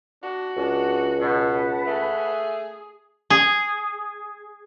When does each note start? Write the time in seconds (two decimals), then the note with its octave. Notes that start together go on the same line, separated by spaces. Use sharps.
0.23 D4 F#4
0.57 C#2 D4
1.21 B2 B4 F#5 A5
1.86 A3 G#4
3.30 G#4